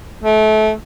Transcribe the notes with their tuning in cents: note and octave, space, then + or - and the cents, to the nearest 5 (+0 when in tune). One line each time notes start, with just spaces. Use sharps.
A3 -25